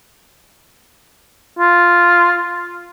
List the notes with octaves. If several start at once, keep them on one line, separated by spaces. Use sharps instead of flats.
F4